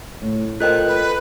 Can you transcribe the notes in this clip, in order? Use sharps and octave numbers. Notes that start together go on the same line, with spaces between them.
A2
F4 A4 A#4 C5 D#5 G5 F#6
B4